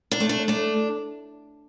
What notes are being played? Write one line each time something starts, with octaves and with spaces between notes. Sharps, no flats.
D4
A3
D4
A3 D4